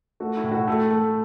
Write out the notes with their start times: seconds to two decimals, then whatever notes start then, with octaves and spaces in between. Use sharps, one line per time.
0.20 A3 F#4
0.37 E4
0.44 A2
0.52 F#4
0.67 A3 A4
0.91 A3